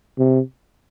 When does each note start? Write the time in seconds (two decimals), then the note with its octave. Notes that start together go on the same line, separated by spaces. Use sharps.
0.18 C3